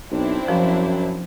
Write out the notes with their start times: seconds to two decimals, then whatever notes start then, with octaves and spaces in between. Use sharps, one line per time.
0.11 B1 C4 D4 E4
0.48 F#2 F3